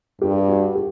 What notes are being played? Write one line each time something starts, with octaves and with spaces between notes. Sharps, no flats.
G2 G4
F#4
G4